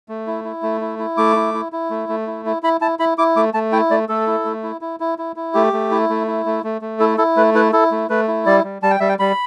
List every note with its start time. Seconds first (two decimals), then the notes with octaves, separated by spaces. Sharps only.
0.09 A3
0.27 E4
0.44 E4
0.63 A3
0.81 E4
0.99 E4
1.17 A3 D6
1.36 E4
1.54 E4
1.72 E4
1.90 A3
2.09 A3
2.27 E4
2.46 E4
2.63 E4 B5
2.81 E4 A5
2.99 E4 B5
3.18 E4 D6
3.36 A3 D6
3.54 A3 A5
3.72 E4 G5
3.90 A3 D5
4.09 A3 A4
4.27 E4
4.45 A3
4.63 E4
4.81 E4
5.00 E4
5.18 E4
5.36 E4
5.54 A3 G4
5.73 A3
5.91 E4
6.09 A3
6.27 E4
6.46 A3
6.64 A3
6.81 A3
7.00 E4 A4
7.18 E4 A4
7.37 A3 B4
7.54 E4 B4
7.73 E4 A4
7.91 A3
8.10 A3 B4
8.28 E4
8.46 G3 D5
8.64 G3
8.82 G3 A5
8.91 G5
9.00 G3 E5
9.09 G5
9.19 G3 B5